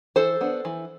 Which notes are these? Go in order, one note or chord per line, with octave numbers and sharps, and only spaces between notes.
E3 A4 C5
B3 D4
E3